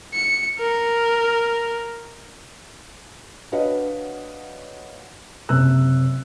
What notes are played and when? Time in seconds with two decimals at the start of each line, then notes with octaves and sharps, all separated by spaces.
0.13 C#7
0.59 A#4
3.52 D4 F#4 B4 C#5 D#5 F5
5.49 F#1 C3 C5 E6 F#6